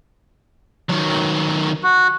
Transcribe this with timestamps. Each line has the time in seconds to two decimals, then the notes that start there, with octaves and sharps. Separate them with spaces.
0.89 D#3 F#3
1.83 F#4